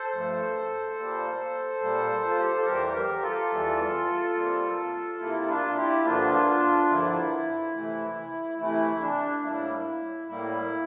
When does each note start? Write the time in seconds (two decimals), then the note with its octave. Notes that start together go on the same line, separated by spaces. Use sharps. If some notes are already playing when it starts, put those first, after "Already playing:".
Already playing: A4 C5
0.12 G2 F3 A3
0.96 A#2 G3 A#3
1.81 A#2 G3 A#3
2.25 F4
2.39 G4
2.52 A4
2.66 E2 E3 G3 G4 A#4
2.94 G4 A#4
3.22 F4 A4
3.50 E2 E3 G3
4.35 C3 G3 A#3
5.19 C3 G3 A#3 E4
5.48 D4 F4
5.76 E4 G4
6.04 G2 D3 F3 A#3 D4 F4
6.89 G2 D3 F3 A#3 E4
7.74 C3 E3 A3
8.58 C3 E3 A3 E4
9.01 D4
9.43 A2 G3 A#3 E4
10.28 A2 G3 A#3 E4